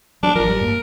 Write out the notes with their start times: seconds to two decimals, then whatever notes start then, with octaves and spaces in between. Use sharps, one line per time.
0.23 F#3 D4
0.35 G#1 F3 A#4
0.48 G3
0.61 G2 A#3